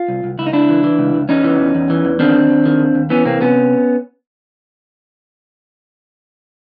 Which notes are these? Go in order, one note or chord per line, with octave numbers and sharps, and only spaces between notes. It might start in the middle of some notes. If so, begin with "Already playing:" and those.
Already playing: F4
C2
C2
C#2 E4
D#4
C#2 D4 E4
E3
E3
C#2
C#2
E2 C#4 D#4
E3
E2
E2
E3
E2
D#3 C4 D4
D#2
D#2
D#3
D#2
D#2
E3 B3 C#4
C3 A#3 C4
C3 B3 C#4